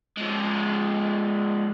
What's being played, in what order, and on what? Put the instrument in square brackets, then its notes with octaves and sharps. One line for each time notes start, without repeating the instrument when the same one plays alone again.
[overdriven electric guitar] F3 G#3